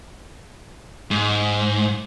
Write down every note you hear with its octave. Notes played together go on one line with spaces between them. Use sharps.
G#2